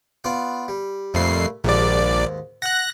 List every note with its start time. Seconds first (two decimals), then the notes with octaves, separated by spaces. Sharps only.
0.24 B3 F4 D5
0.68 G3
1.14 F2 A#2 G3 A3 C7
1.64 A#1 D#2 G#2 D5
2.62 F#5 F#6 A#6